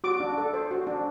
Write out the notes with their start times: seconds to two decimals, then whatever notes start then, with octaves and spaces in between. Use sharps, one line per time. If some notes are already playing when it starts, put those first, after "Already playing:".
0.04 F#4 D6
0.20 D4
0.38 A4
0.54 C5
0.71 F#4
0.87 D4